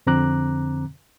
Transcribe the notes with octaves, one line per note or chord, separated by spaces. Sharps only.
F2 D3 C4 A#5 D6 F#6